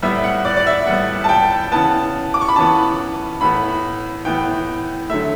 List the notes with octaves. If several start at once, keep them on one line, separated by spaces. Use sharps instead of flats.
A2 G3 B3 E5
F#5
D5
D5
E5
A2 G3 B3 F#5
A5
G5
C#3 E3 B3 A5
D6
C#6
B5
C#3 E3 B3 A5
A2 E3 B3 B5
A2 E3 B3 G5
D3 F#3 A3 E5